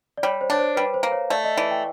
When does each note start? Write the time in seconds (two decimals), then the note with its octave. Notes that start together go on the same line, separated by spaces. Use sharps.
0.17 D5
0.23 G3 C#5
0.41 C5
0.50 D4 C#5
0.59 C5
0.76 G3 B4
0.94 C5
1.03 A#3
1.12 C#5
1.30 A3 D5
1.44 D#5
1.57 E3 D5
1.71 G5